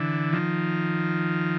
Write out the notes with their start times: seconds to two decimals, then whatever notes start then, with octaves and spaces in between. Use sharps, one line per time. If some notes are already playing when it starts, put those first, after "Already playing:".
Already playing: D3 E3
0.33 D#3 F3